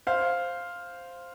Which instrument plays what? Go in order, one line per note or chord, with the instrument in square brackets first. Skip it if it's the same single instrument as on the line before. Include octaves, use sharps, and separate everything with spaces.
[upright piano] C5 F5